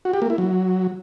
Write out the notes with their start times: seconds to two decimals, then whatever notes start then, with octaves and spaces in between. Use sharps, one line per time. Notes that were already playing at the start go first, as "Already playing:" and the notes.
0.05 F#4
0.13 G4
0.22 A#3
0.30 E4
0.38 F#3